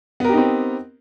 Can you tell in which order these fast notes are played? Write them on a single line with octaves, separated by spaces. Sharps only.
B3 A#4 G4 D#4 C4